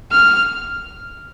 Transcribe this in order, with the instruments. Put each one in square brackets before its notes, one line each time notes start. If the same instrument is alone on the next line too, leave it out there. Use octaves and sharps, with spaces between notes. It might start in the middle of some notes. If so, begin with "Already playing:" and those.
[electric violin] F6